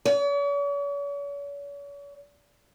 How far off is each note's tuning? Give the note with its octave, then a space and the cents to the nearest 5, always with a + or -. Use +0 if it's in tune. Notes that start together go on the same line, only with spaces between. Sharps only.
C#5 +45